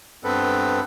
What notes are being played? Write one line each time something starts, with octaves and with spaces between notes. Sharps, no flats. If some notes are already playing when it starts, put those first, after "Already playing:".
G2 B3 C4 A4 B4